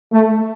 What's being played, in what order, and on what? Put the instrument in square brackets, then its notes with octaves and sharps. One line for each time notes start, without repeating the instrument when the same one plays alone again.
[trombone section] A3